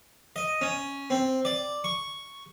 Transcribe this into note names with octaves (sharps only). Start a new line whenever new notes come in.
D#5
C#4
C4
D5
C#6